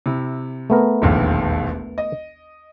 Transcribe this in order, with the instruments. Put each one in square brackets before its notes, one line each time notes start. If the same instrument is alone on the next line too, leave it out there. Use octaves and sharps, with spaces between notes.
[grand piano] C3 E4
[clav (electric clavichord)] A3 B3 A#4
[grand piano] E1 A#1 D#2
D#5